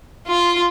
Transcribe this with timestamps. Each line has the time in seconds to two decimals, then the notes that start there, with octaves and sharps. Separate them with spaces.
0.28 F4